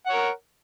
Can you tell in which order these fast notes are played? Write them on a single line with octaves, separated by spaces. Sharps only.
F#5 C#5 A#4